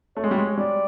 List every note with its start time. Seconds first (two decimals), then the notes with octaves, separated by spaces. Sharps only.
0.16 A3 C#5
0.24 G#3
0.31 G3
0.38 G#3
0.57 G3 D5